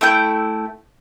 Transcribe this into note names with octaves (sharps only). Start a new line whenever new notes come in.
A3 E4 G5 G6